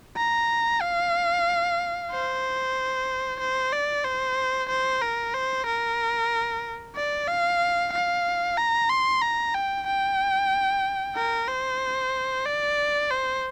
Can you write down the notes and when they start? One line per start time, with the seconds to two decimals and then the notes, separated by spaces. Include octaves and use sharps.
0.17 A#5
0.81 F5
2.11 C5
3.40 C5
3.72 D5
4.04 C5
4.69 C5
5.02 A#4
5.34 C5
5.66 A#4
6.96 D5
7.28 F5
7.93 F5
8.58 A#5
8.90 C6
9.22 A#5
9.54 G5
9.87 G5
11.16 A#4
11.48 C5
12.46 D5
13.11 C5